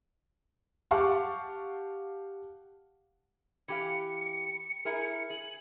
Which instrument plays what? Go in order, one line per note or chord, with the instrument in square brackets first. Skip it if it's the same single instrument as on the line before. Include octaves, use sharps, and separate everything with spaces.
[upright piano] G4 F5 F#5 A5 C#6 D6
[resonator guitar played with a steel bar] E3 G4 F5 [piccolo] C#7
[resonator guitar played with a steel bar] E4 G#4 A#4
[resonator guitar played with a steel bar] G#4 [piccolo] F#7